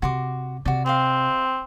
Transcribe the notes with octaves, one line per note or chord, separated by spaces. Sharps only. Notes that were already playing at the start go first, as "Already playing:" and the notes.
C3 F#4 C6 D6
C3 F#4 D5
C4 G4 D#5 F5